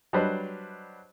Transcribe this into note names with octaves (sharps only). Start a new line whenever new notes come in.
F#3 G3 D4 B4 C5 D#5